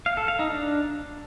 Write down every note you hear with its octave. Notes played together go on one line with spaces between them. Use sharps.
F5
A4
F5
D#4
D4